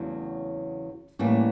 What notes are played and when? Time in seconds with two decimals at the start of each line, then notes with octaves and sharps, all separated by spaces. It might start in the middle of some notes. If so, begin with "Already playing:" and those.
Already playing: E2 C#3 F#3 A3 C4
1.19 A2 E3 G3 A#3 C#4